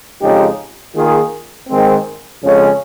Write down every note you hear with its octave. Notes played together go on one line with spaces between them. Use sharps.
F2 C#3 G#3 D#4 G4
D#3 A#3 F4 G#4
G#2 D#3 G#3 C4
F2 C#3 G#3 C#4